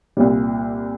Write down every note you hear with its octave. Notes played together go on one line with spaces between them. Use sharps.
C2 A#2 G3